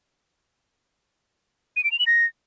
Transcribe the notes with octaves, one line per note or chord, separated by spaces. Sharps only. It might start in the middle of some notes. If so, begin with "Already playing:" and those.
D#7
D7
F7
F#7
A#6